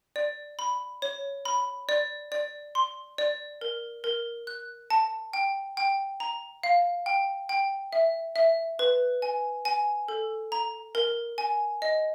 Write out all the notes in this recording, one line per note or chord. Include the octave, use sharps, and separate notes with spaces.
D5
B5
C#5
B5
D5
D5
C6
D5
A#4
A#4
F#6
A5
G5
G5
A#5
F5
G5
G5
E5
E5
B4
G#5
G#5
A4
A#5
A#4
G#5
D#5